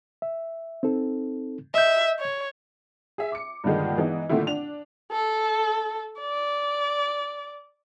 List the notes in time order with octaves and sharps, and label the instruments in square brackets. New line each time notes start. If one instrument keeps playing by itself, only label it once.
[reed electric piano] E5
C4 D#4 A4
[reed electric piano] D#5 G6 [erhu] E5
[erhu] C#5
[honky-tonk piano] G#4 E5
D6 C#7
G2 A#2 D3 D#3 G#3
E3 G#3 B3 D#4
A#2 D3 D#3 A3 C4 E4
D4 F7
[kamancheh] A4
D5